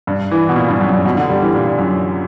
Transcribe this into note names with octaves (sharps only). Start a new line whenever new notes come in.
G2
E3
B2
A#2
G2
F#2
G2
B2
D3
G3
E3
A#2
F#2